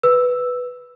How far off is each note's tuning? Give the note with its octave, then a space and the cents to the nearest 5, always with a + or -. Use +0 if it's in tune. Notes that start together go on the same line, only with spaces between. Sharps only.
B4 +0 E6 +0